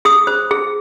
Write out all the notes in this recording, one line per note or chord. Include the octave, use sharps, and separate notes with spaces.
G#4 D#6
C5
G#4